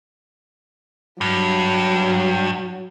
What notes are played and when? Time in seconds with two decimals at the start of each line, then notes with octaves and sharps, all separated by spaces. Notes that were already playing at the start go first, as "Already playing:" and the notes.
1.21 G2 F#3